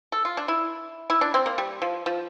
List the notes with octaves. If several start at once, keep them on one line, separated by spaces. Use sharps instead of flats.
A4
F4
D4
E4
E4
D4
C4
A#3
G3
F3
F3